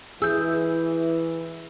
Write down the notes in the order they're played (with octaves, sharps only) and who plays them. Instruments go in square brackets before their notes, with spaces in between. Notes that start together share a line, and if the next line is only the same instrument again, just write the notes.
[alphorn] E3 [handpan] G#4 [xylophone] E6 G6